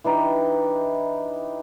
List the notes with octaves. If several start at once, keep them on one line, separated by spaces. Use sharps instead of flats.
E3 D4 D#4 G4